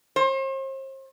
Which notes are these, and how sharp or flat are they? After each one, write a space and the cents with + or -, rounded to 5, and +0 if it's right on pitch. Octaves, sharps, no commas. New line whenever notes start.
C5 +40